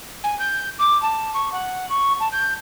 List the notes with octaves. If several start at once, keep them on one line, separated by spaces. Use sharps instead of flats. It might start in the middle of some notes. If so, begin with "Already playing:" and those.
G#5
G6
D6
A5
C#6
F#5
C#6
A5
G6